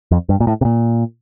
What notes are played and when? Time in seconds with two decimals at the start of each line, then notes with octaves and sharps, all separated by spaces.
0.11 F2
0.29 G2
0.40 A#2
0.47 A2
0.61 C3
0.65 A#2